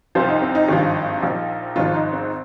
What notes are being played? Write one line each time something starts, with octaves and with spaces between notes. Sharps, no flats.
C2 C3 F3 C5
D#4
C4
D#4
G#1 G2 F3
A#1 A#2 F3
G#1 G#2 F3 F4
D#4
C4